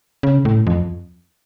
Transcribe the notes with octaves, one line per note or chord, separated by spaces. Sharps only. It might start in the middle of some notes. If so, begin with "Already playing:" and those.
C#3
A2
F2